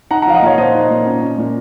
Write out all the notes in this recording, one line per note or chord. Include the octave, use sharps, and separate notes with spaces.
D#4 F#5 A#5
F#5 A#5
F3 F5
D#5 F#5
A#2 C#5 F5
A#2 C5 D#5
D#4
A#2
C#4
C#4
A#2